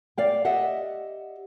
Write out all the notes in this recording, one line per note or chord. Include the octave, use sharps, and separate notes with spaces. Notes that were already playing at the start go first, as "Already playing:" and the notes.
D5 F5 G5
G4 D#5 E5 F#5